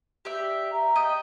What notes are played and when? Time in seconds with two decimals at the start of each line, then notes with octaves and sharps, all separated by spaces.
0.25 G4 D5 E5
0.72 A#5
0.96 D#5 G5